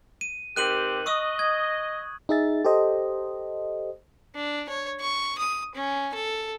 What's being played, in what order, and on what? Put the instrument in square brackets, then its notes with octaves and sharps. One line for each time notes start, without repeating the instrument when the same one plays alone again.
[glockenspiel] D#7
[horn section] D#3 C4 G4 [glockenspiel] F#6 D#7 F#7
[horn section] D#5 [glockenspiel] C#6 D#6 E6
[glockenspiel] G#6
[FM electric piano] D#4 G#4 E5 A6
G4 A4 C5 D#5
[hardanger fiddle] D4
C#5
C#6
D#6
C#4
A4